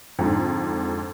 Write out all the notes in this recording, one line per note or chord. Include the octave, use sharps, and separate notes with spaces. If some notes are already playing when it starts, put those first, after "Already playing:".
F2 G#2 D3